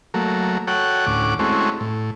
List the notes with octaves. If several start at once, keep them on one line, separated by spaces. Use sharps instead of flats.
F#3 A3 A#3
F#4 A4 C#5 F#5 G5
D2 A2 C#4 F#5 D6
G#3 A3 C4 C#4 E4 F#4
A2